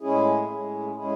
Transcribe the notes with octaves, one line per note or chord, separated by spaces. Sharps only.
A2 G#3 C#4 E4 G#4
A2 G#3 C#4
A2 G#3 C#4 E4 G#4